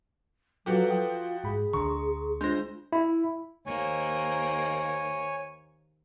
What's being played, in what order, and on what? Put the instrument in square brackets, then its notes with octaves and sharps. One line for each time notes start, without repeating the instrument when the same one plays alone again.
[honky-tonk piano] F3 F#4 G4 [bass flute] F#3 [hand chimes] A4 B4
[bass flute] F4 [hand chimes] G5 D#6
[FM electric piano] G#2 B5 [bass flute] G#4
[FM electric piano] D2 D3 [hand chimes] A#5 C6 [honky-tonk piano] C#6
[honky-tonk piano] G#3 C5 [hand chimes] D4 F4 [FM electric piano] G6 A#6
[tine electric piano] E4
[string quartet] D#2 A#3 C5 [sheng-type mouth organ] C#5 G#5